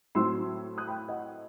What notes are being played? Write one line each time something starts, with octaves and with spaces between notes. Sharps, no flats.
A2 F#3 C4 C6 E6
D#6 F#6
G5 B5
D#5 F#5